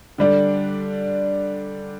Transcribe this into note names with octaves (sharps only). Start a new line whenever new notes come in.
D3 G3 D4